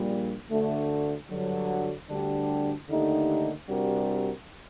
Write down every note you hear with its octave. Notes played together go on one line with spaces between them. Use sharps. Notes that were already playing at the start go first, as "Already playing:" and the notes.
Already playing: A#1 A#2 G3
D2 D3 A3
G2 D3 F#3
D2 D3 G3 D4 G4
D#2 D3 A3 D#4 G4
C3 G3 D4 F#4 A#4